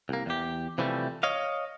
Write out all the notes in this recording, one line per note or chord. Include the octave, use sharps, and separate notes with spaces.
C2 A#3
E2 G4
C3 E3 F3 G3 A3
C#5 D#5 F5